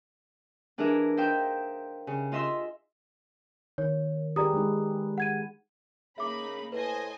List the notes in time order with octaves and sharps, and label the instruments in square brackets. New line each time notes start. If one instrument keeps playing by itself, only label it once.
[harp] E3 D4 E4 G#4 A#4 E5
D#4 C5 E5 F5 G5
C#3
F4 D#5 E5 C6 E6
[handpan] D#3 [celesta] C#5
[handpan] G4 G#4 B4 [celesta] D5 A#5 D#6
[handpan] G#3 D#4
[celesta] F#5 G#6 D#7
[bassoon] C#3 [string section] A#3 D#4 B5 [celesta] E5 D6
[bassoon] A2 [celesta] B4 [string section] C5 D#5 G#5